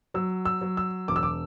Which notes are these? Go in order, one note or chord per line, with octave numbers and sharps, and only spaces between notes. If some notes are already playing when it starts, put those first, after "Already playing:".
F#3 E6
E6
F#3
E6
E1 D6
E6
D6